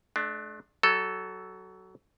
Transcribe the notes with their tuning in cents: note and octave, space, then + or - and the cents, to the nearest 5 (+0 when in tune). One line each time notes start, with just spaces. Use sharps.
A3 -40 D4 +15
F#3 +25 A4 +0